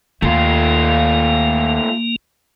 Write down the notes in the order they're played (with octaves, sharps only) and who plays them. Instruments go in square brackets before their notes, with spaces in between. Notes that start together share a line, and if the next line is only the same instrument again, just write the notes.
[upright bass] D#2 [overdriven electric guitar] A3 F4 [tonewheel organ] A#3